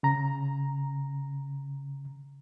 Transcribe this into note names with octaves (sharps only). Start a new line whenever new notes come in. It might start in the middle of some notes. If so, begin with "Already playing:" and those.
C#3 A#5